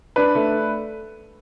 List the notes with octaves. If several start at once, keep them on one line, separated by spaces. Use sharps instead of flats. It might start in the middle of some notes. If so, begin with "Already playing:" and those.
D4 B4
A3